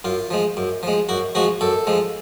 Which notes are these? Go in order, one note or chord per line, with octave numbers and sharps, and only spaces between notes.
F#2 F4
F3 G#3
F#2
F3 G#3
F#2 F#4
F3 G#3 F#4
F#2 A4
F3 G#3